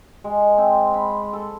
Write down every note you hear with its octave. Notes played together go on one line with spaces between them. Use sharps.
G#3
C4
B5
A4